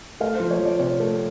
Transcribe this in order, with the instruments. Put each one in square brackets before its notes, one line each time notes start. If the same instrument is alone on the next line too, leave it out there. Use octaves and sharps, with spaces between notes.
[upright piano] A3 [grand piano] F5
[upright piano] F3 [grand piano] C5
[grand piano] C#5
[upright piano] F3
[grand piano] D5
[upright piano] C3 [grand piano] C#5
[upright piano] A3